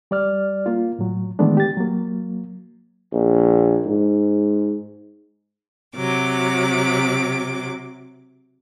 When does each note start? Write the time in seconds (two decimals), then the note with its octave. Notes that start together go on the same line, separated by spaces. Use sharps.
0.11 G3 D5 F6
0.66 A#3 F4
0.99 A2 F#3
1.39 D#3 E3 G#3 A3 B3 D4
1.57 G4 A6
1.77 F#3 A#3
3.13 A#1
3.85 G#2
5.95 C3 F#3 D6